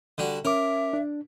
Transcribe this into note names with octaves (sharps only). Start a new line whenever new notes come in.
D3 G3 F#4
C#4 A#4 E5 D6
D4